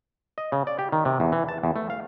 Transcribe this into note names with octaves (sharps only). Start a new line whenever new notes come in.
D#5
C#3
D5
G4
D#3
C3
E2
E3
A5
E2
A3
F5